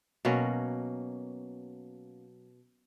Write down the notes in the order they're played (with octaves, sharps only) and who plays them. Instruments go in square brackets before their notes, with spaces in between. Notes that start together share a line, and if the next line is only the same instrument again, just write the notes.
[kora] B2 F#3 A#3 C#4